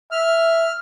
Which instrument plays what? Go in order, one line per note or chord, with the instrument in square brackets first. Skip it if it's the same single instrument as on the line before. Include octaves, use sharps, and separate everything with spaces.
[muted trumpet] E5 [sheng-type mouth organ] F6